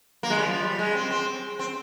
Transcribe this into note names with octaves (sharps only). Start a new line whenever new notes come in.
A#3
G#3
G3
F3
G3
G#3
C4
C4
C4